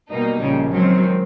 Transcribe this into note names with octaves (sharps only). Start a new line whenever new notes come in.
B2 G3 A#3 D#4
A#1 A#2 C#3 G3
D#3 F#3 G#3 C4